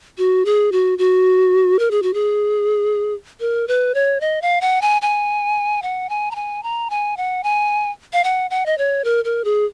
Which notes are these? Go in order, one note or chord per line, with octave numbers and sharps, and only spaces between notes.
F#4
G#4
F#4
F#4
A#4
G#4
F#4
G#4
A#4
B4
C#5
D#5
F5
F#5
G#5
G#5
F#5
G#5
A#5
G#5
A#5
G#5
F#5
G#5
F5
F#5
F#5
D#5
C#5
A#4
A#4
G#4